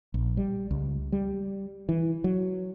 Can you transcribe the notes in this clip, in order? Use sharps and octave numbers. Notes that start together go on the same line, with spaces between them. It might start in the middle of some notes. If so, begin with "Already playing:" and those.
A#1
G3
C#2
G3
E3
F#3